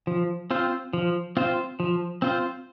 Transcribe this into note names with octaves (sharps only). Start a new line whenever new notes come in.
F3
C4 F4 C5
F3
C4 F4 C5
F3
C4 F4 C5